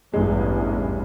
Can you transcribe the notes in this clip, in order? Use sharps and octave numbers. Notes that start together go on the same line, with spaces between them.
A1 E2 G2 G#3